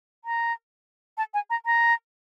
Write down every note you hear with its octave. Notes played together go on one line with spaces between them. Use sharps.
A#5
A5
G#5
A#5
A#5